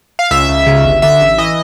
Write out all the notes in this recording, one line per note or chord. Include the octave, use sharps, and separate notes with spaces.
F5
C#2 E5
C#2
C#3
G1
D3 E5
A1
E3 D#5